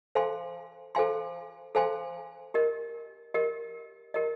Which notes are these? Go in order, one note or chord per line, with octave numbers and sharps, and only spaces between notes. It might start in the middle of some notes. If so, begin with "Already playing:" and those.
A4 C5 F5 G#5 C6
A4 C5 F5 G#5 C6
A4 C5 F5 G#5 C6
G4 A#4 D#5
G4 A#4 D#5
G4 A#4 D#5